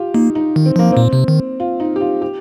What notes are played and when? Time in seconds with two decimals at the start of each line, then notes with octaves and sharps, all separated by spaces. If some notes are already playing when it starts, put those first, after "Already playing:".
Already playing: F4 G4
0.14 A#3 D#4
0.35 D#4
0.56 D#3
0.66 C4
0.76 F3 A#3
0.92 A#2 C4
1.13 C3
1.28 D#3
1.60 F4
1.80 D#4
1.96 G4
2.01 F4
2.22 G4